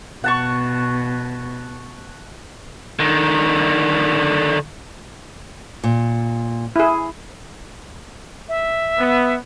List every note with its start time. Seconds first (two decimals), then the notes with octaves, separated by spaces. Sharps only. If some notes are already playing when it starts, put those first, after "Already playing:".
0.24 B2 F#5 A5 C#6
3.00 D3 D#3
5.84 A#2
6.76 E4 G#4
8.49 E5
8.99 B3